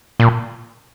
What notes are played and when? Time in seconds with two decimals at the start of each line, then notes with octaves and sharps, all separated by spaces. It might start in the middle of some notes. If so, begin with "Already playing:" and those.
0.20 A#2